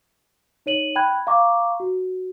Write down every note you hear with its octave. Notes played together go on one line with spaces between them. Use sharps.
D#4 C#5 D#7 F#7
G5 B5 F#6 G#6
F5 A#5 C#6 D6
F#4